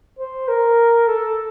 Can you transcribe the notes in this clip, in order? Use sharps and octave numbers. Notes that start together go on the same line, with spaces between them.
C5
A#4
A4